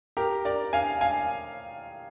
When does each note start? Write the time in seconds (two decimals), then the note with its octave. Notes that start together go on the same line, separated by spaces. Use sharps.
0.17 G4 A#4
0.45 A#4 D5
0.73 F5 G#5
1.01 F5 G#5